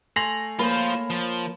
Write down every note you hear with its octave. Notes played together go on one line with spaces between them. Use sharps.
A3 G#5 C6 A#6 F7 F#7
A#3 F4 A#4 C5 C#5 B5
F3